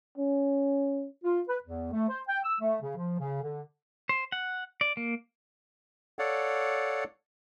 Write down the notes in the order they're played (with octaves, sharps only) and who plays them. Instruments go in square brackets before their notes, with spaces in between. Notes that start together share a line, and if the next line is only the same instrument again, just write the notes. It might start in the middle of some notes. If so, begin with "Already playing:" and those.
[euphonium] C#4
[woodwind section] F4
B4
E2
A3
C5
G5
E6
A3
C#3
F3
C#3
D3
[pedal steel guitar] C5
F#5
D5
A#3
[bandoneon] A4 C#5 D5 F5 F#5